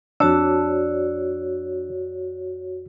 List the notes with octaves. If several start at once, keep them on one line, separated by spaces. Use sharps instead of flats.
F2 D4 F#4 C#5 D5 E6